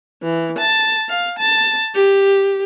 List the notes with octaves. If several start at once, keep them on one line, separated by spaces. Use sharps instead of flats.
E3
A5
F5
A5
G4